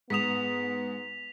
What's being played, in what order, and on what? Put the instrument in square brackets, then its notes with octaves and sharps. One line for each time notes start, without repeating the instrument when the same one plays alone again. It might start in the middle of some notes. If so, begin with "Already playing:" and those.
[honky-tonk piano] G#2 D#6 E7 [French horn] B3 [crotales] B6 F7